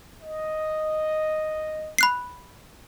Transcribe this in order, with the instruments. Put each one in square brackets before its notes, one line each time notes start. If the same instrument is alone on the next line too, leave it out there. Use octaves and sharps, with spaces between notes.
[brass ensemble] D#5
[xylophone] B5 F#6 C7